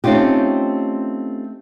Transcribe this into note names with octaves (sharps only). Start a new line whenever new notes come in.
A3 C4 C#4 D#4 F4 G4